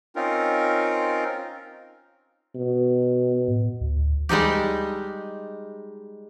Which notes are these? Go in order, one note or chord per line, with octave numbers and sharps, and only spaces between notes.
C4 C#4 D#4 F4 A#4
B2
A2
D2
G3 G#3 D#4 G4